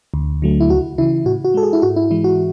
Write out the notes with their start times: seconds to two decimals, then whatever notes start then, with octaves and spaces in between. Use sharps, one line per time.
0.14 D2
0.42 D3 F#3 A3
0.60 E4
0.70 C#2 F#4
0.98 C#3 E3 E4
1.25 A2 F#4
1.45 F#4
1.54 G#3 A4
1.63 G#4
1.73 E4
1.82 G#2 F#4
1.96 E4
2.11 E3 G#3 E4
2.24 F#4